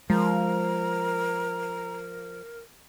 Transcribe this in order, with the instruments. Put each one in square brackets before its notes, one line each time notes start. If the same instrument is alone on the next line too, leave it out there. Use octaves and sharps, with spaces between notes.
[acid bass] F3 [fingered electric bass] G#3 [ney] A#4 [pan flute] A#5